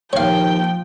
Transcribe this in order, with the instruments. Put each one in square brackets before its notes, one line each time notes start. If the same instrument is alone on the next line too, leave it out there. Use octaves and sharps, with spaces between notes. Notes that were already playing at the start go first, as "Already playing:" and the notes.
[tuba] D#2 [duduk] F3 [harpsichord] C#5 F5 [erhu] G5